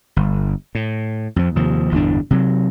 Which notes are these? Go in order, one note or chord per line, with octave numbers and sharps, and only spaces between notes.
G1
A2
F2 F3
D#2 C3 F3
G1 E2 A2 D4
C3 F#3